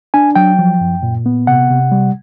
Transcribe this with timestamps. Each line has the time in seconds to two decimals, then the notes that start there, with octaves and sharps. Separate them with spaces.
0.14 D4 G#5
0.35 F#3 G5
0.59 F3
0.81 F#2
1.03 A#2
1.26 B3
1.47 C3 F#5
1.70 C3
1.92 G3